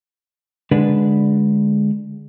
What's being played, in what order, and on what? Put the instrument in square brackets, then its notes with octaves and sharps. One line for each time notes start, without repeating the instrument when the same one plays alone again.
[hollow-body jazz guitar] D3 G#3 D4 B4